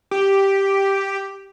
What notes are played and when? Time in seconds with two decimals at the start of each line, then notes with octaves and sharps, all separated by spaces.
0.11 G4